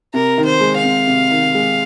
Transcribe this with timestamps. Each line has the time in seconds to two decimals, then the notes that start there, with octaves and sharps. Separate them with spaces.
0.14 C3 A#4
0.38 D#3
0.45 C5
0.60 G#3
0.76 F5
0.84 C4
1.07 C3
1.31 D#3
1.54 G#3